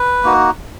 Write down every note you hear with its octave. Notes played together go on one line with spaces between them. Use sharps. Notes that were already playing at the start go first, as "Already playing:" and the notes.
Already playing: B4
A#3 D#4 F#4